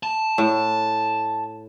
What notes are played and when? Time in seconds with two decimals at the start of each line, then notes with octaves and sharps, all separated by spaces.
0.03 A5
0.38 A2